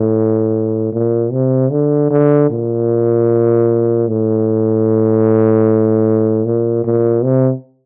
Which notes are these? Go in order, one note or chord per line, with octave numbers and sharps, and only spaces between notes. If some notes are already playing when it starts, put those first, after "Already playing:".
Already playing: A2
A#2
C3
D3
D3
A#2
A2
A#2
A#2
C3